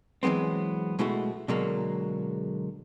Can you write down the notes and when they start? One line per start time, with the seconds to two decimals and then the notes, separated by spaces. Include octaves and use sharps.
0.23 E3 F#3 G#3 B3 C4
0.99 B2 G#3 A3 E4 F#4
1.48 B2 D3 F#3 G#3 A#3